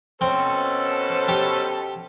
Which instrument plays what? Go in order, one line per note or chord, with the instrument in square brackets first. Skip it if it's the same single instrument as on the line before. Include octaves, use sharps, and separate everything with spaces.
[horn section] B2 C#4 A4 [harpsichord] C4 [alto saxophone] C5
[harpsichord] G4